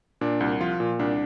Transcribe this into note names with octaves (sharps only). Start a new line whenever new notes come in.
A#2 D4
C2
F3 F4
A#2
C2 D4